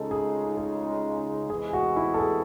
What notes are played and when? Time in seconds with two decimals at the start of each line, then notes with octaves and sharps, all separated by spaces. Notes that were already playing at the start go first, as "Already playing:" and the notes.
Already playing: C#2 C#3 G#3 D#4 A4
0.11 G#4
0.57 G#4
1.50 E2 C3 E3 G#3 G#4
1.73 F#4
1.97 E4
2.14 A4
2.19 G#4